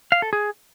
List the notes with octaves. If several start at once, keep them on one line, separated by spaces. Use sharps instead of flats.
F5
A4
G#4